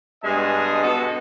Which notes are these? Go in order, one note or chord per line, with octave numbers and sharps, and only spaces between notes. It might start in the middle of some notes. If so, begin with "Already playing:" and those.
G2 B2 G#3 G#4 D#5 A5
B2 B3 A4